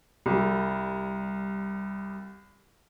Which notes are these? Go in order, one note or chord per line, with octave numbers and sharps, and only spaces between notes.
C2 G3